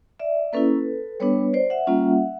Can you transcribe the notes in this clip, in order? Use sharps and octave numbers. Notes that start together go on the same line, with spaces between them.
D5 E5
A#3 C#4 E4 A4 B4
G3 B3 D4 B4 C#5
C5 D5
E5 F#5
G3 A#3 C#4 F4